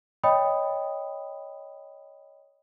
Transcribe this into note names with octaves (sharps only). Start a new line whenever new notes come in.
C#5 D#5 G5 B5 D#6